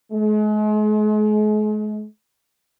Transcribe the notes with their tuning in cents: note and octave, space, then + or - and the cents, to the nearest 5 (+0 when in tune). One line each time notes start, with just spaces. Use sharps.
G#3 +40